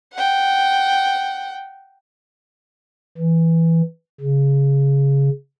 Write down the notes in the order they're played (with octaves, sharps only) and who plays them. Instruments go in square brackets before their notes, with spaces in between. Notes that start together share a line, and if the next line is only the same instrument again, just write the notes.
[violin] F#5 G5
[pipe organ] E3
C#3